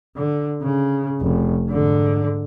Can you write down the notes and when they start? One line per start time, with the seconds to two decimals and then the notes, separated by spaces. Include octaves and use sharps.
0.16 D3
0.62 C#3
1.21 F1
1.68 G#2 D3